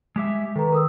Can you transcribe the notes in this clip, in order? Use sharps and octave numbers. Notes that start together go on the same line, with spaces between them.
G#3 G4 E5
D#3 A4 B4 A#5
A#4 D#6 E6